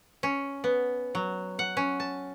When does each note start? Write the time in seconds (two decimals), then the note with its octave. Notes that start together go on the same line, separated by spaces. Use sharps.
0.23 C#4
0.64 B3
1.15 F#3
1.59 F#5
1.77 C#4
2.00 A5